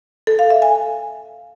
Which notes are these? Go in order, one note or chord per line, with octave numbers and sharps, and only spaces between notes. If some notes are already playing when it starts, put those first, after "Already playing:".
A4
F5
E5
G#5